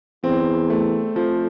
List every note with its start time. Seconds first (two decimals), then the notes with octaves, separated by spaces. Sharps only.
0.23 E2 C4
0.70 A3
1.16 F2 F3